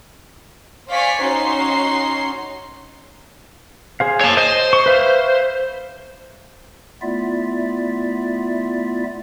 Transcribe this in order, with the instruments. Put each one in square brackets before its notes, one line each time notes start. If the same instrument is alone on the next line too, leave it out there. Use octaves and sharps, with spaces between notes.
[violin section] C5 D5 F5 G#5 C#6 B6
C#4 D#4 F#4 C6 C7
[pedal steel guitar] G#4 C5 F5
[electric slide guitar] C#5 A5
[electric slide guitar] C5 [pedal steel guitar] D#5
[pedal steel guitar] C#6
B4 E5 F5
[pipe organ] A3 B3 E4 F4 D5 E5